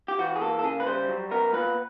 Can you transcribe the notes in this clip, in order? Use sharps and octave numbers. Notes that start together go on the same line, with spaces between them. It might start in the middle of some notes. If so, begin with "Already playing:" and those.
G4
E3 F#4
G#4
A#3 A4
A4
C#3 G#4
B4
G3 C5
F#3
B3 A#4
A#2 B4